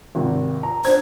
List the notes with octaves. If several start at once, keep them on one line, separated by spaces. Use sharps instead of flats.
G#1 C3
A#5
D4 C5 G#6